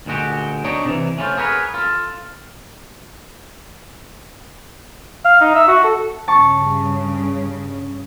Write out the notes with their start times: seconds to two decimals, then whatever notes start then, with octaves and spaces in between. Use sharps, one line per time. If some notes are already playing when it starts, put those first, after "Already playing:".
0.06 D2 A#2 G#3 F#4 G4
0.65 D4 D#4 C#5 D#5
0.85 C3 E3
1.18 A3 C#4 D#4 F4 C5
1.37 G#4 A#4 B4 C#5
1.74 F4 A4
5.25 F5
5.41 D#4
5.55 E5
5.68 F#4
5.84 A4
6.28 G2 C#3 A5 C#6